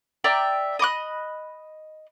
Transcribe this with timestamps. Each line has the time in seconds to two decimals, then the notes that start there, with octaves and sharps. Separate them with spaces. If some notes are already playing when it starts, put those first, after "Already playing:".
0.24 D5 E5 G5 A#5
0.79 D#5 B5 D6 F#6